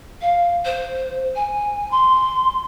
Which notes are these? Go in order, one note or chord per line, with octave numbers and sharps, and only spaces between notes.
F5
C5
G#5
C6